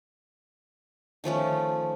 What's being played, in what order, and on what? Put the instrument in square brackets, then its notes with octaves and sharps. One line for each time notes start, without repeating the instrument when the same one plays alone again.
[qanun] D#3 F3 A3 C#4